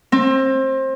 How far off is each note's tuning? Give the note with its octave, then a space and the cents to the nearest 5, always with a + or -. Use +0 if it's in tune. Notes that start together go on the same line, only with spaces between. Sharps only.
C4 +25